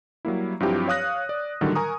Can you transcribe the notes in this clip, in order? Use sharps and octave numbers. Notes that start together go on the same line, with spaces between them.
F#3 G3 A#3 E4
G2 F3 F#3 C4 E4 G4
C#5 F5 D#6 F#6 A#6
D5
A2 D3 D#3 F#3 G3
A#4 G#5 A#5 C#6 D#6